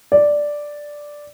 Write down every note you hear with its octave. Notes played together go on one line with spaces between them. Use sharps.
D5